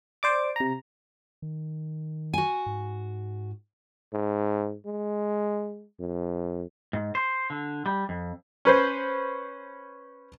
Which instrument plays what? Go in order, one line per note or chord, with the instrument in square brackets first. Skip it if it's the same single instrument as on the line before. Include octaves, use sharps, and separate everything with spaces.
[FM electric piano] C5 D5 D6
C3 A#5
[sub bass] D#3
[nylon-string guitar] F#4 G#5
[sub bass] G#2
[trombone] G#2
G#3
F2
[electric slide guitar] G#2
C5
D3
G3
F2
[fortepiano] C#4 B4 C5